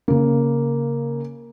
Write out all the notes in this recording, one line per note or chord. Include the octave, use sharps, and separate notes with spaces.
C#3 A#3